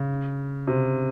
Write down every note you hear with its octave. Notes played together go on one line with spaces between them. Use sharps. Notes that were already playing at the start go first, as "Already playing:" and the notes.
Already playing: C#3
C3